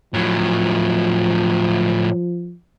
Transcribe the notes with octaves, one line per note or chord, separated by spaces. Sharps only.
A2 F3 F#3